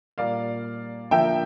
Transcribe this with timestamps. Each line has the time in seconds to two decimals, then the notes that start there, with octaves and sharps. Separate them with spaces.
0.18 A#2 G3 A#3 D5 F5
1.11 D3 F3 A#3 E5 G5